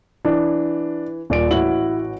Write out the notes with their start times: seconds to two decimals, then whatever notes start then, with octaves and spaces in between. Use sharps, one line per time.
0.25 E3 D4
1.30 D#1 A#2 D5 D7
1.51 A1 E4 F#4 F#7